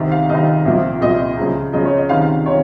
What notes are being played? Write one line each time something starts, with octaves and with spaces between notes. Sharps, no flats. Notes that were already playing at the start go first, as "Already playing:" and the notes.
Already playing: C2 C3 D#3
F5
C2 C3 D#3 D#5
C2 A#2 F3
C2 A#2 F3 D#5
C#2 C#3 F3
C#2 C#3 F3 D#5
C#5
D#5
C#2 C3 D#3 F5
F5
C3 D#3 C#5